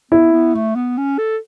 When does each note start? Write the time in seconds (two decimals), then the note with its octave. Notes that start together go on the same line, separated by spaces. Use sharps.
0.11 B3 E4
0.33 B3
0.55 A3
0.76 B3
0.97 C#4
1.18 A4